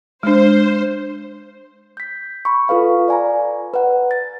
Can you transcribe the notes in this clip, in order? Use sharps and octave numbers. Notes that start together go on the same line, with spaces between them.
G#3 D4 C5
G6 B6
B5 C#6
F4 A4 B4 F5 B5
D5 G#5 A#5
B4 F#5
A6